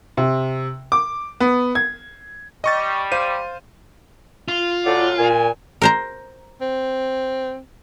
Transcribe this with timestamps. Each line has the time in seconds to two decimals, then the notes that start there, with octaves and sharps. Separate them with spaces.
0.17 C3
0.92 D6
1.40 B3
1.75 G#6
2.64 G3 D#5 C#6 A6
3.12 C5 F5 D#7
4.48 F4
4.86 F#2 A2 D5 F#5
5.19 A#2 G#5
5.82 A#4 C5 A#5
6.61 C4